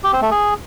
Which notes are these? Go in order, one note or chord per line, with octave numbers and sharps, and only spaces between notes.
G4
C4
A3
G#4